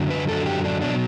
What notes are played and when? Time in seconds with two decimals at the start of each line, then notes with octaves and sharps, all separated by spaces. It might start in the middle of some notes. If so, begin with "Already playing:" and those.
Already playing: F#2 D3 F#3
0.10 B4
0.29 F#2 D3 F#3 A4
0.46 G4
0.65 D4
0.82 B2 F#3 D4